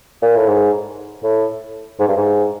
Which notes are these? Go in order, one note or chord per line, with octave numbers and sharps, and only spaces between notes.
A#2
A2
G#2
A2
G#2
G2
G#2